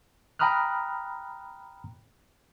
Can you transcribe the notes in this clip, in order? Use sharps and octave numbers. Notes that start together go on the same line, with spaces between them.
G5 A#5 B5 D#6 F6 F#6